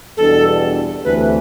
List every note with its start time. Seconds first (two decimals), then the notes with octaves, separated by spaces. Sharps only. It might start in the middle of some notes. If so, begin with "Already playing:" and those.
0.17 E2 B2 G3 D4 A4
1.04 D2 C3 E3 A3 B4